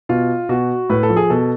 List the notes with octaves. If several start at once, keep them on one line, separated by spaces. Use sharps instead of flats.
B2 F4
B2 F#4
A2 B4
A4
F3
G#4
B2 A4